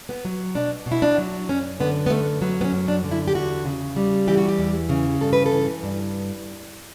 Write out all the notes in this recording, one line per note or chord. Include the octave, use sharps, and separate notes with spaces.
B3
F#3
B2 D4
B2
E4
D4
F#3
F#2 C#4
D3 B3
B3
F#2 A3
F#3 B3
B3
C#4
F#2
D4
D3
E4
G4
E2 F#4
C#3
G3
E3 G4
F#4
G4
E2
C#3
G2 A4
B4
A4
E3
G2